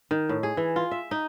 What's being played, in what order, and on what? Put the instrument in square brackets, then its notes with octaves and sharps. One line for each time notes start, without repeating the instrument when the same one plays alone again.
[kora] D#3
A2
G#4
E3
F4
E5
D#4